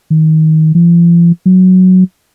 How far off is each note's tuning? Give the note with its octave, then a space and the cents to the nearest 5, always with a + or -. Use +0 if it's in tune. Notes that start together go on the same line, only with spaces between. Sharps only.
D#3 +20
F3 -40
F#3 +0